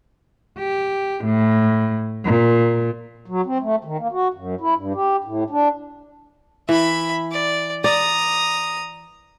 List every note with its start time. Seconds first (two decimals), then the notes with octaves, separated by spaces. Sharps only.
0.59 G4
1.26 A2
2.25 A#2
3.26 F#3
3.46 C4
3.61 A3
3.84 D#3
3.99 A#3
4.12 F#4
4.34 F#2
4.61 E4
4.75 G2
4.94 G4
5.24 A2
5.50 D4
6.69 E3 E5 B5
7.31 D5
7.84 D5 A#5 D#6